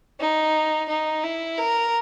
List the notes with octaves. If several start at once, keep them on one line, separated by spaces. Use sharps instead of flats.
D#4
D#4
E4
A#4